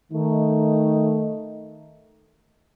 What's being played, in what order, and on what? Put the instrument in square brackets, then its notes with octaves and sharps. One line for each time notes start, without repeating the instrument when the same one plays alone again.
[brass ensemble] D#3 A3 D#4